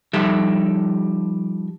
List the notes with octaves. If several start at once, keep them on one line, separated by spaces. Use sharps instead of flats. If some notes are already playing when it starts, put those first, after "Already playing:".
F3 G3 D#4 G4 A4 E5